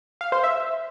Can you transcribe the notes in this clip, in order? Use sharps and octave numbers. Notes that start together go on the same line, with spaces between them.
F5
C5
E5